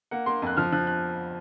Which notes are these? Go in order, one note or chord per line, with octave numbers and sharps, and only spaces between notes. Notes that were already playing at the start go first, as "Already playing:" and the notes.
A#3 F#5
A#3 C6
F2 F#6
F3 F6
F3 F#6
F#6